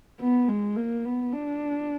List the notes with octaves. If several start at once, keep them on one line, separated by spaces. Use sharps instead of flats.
B3
G#3
A#3
B3
D4